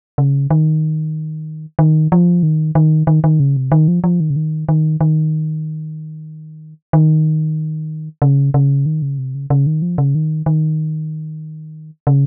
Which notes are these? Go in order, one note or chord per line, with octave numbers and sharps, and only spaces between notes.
C#3
D#3
D#3
F3
D#3
D#3
D#3
D#3
C#3
C3
D#3
F3
F3
D#3
C#3
D#3
D#3
D#3
D#3
C#3
C#3
D#3
C#3
C3
C#3
C#3
D#3
F3
C#3
D#3
D#3
C#3